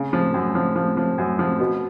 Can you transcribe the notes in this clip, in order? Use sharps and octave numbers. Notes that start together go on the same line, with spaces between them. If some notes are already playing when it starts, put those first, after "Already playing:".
Already playing: C#3
F3
F#2
F3
F3
F3
F#2
F3
B2